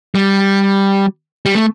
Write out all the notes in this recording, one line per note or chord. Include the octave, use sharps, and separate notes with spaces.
G3
G3
A3